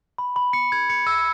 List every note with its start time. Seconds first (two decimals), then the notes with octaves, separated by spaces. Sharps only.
0.18 B5
0.36 B5
0.53 C#7
0.72 G#6
0.90 C#7
1.07 E6